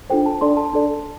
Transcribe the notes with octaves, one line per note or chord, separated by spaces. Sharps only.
D4 F4 A4 C5 G5
A5
D4 A4 D5 C6
A5
D4 A4 D5